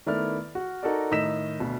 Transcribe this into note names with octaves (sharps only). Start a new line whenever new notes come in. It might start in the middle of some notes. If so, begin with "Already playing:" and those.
D#3 A3 B3 E4 D5 F6
F#4
D#4 F#4 A4 A#4 D5
A2 D#3 D#5 E6 B6 E7
D2 B2